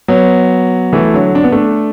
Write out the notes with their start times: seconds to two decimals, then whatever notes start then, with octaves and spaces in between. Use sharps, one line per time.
0.08 F#3 B3
0.93 E3 A3
1.14 D3 F#3
1.35 D4
1.44 B3
1.52 A3 D4